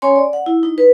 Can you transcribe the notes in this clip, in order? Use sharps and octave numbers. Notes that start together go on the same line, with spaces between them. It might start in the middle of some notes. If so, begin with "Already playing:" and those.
C#4 C#5 G#5 C6
D5
F#5
E4
D#4
B4